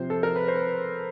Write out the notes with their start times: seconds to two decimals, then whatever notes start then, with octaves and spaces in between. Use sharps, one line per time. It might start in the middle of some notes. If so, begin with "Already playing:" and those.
Already playing: C3 F3 C5
0.10 A4
0.23 A#4
0.36 B4
0.48 C5